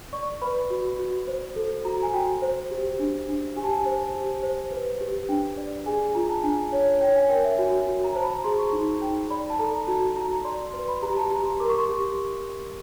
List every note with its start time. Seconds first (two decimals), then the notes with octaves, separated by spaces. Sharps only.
0.13 D5 C#6
0.42 B4 B5
0.70 F#4
0.99 F#4
1.28 C5
1.56 A4
1.84 F#4 A#5
2.03 G#5
2.13 F#4 G5
2.42 C5
2.71 G4
2.99 D4
3.28 D4
3.57 G4 G#5
3.64 A5
3.71 G#5
3.86 C5
4.14 G4
4.43 C5
4.71 B4
5.01 G4
5.29 D4 G5
5.57 D5
5.86 G#4 G#5
6.15 F4 A#5
6.29 A5
6.43 D4 G#5
6.72 C#5
7.01 C#5 G5
7.16 G#5
7.30 A#4 G5
7.44 E5
7.58 F#4 G#5
7.87 F#4
8.04 A#5
8.15 C5 A5
8.23 B5
8.30 A#5
8.44 G#4 C6
8.59 C#6
8.73 D#4
9.02 D#4 G5
9.30 D5 B5
9.50 A5
9.59 A4 A#5
9.88 F#4 A5
10.16 F#4 A#5
10.45 D5 C6
10.59 C6
10.74 B4 C6
10.88 B5
11.02 G4 A#5
11.17 A5
11.31 G4 A#5
11.45 C6
11.60 A#4 D6
11.69 C#6
11.78 C6
11.88 G4 C#6